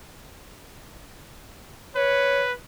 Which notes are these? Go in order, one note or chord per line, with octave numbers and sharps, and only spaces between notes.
B4 C#5